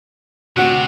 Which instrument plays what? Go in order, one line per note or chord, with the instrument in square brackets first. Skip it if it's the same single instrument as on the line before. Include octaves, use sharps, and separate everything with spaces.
[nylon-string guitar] D2 F#5 [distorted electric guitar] C3 [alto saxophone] F#4